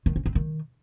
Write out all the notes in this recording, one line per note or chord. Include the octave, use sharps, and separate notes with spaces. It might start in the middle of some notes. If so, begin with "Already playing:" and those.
D#3
C#4
C4
D#3